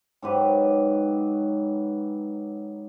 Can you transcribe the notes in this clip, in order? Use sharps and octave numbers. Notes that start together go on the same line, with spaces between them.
G#2 F#3 G4 B4